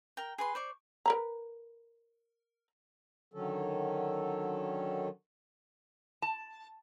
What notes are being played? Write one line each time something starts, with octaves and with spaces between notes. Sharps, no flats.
A#4 G5
G#4 B4 C6
C5 D5 C#6
A#4 B4 A#5
D3 D#3 F#3 C#4 A4
A5